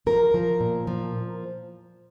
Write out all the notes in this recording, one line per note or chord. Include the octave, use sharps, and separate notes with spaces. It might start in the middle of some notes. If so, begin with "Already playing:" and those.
F3 A#4
F3
A#2
F3